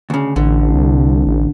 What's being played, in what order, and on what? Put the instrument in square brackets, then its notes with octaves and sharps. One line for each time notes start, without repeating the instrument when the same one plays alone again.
[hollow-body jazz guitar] D2 C#3
[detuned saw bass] A1 [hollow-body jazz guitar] D3
[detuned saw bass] C2
A1